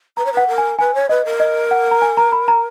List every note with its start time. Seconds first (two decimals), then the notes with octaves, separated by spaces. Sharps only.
0.17 B4 A#5
0.25 C#5
0.32 B4 F#5
0.47 A#4
0.58 G#5
0.79 B4 G#5
0.94 C#5
1.09 B4 D#5
1.25 A#4
1.40 D#5
1.71 F#5
1.91 A#5
2.02 G#5
2.17 A#5
2.32 B5
2.48 A#5